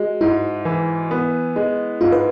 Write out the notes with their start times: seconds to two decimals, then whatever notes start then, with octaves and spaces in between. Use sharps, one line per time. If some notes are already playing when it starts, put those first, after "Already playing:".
Already playing: G#3 F#4
0.21 G#2 E4
0.65 E3
1.11 B3
1.56 G#3
2.01 G#2 F4
2.12 B4